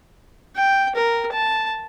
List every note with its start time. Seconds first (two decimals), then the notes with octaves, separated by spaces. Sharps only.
0.55 G5
0.95 A#4
1.33 A5